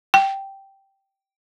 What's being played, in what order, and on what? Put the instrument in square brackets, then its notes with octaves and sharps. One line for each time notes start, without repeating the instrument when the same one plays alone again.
[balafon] G5